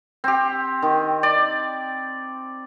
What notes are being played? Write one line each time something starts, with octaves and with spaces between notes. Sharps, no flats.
C4 G4
D#3
D5